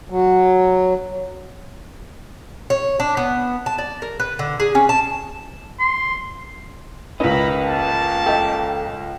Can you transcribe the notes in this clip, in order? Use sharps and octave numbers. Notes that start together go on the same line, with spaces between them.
F#3
C#5
D4
B3
A5
D5
A#4
B4
D3
G#4
C#4
A5
C6
C#2 C#4 A#4 B4 D#5 E5 A#5 B5
A3 A#3 A5
A4 D#5 E5 G5 A#5